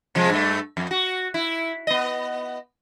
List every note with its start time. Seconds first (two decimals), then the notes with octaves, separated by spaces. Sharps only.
0.15 C3 F3 G#3
0.30 G2 A3
0.77 F2
0.91 F#4
1.34 E4
1.87 B3 D#5